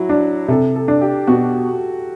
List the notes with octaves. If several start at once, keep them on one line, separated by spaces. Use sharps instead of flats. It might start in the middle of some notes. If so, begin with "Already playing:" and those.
Already playing: F#3 E4 F#4
D4
C3 A4
A4
D4
G4
B2 F#4